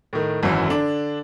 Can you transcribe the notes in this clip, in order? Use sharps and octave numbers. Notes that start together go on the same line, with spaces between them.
A2 D#3
G#1 F#2 E3
D3 D4